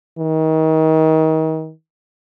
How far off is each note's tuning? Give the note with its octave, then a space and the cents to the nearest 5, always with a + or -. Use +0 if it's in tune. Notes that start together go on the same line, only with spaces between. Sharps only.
D#3 +30